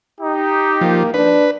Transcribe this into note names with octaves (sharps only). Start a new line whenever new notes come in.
D#4 G4
F3 A#3
D4 B4